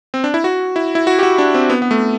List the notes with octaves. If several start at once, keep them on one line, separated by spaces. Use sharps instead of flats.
C4
D4
E4
F#4
E4
E4
F#4
G4
F#4
D4
C4
B3
B3
A3